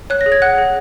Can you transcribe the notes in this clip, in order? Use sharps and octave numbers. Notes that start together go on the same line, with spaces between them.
C#5 F#6
A#6
G#4
G#6
F#5 F#6
G#4